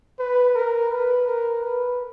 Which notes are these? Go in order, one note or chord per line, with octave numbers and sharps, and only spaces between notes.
B4
A#4
B4
A#4
B4